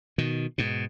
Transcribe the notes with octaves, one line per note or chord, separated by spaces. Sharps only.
B2 D#3
G#2 B2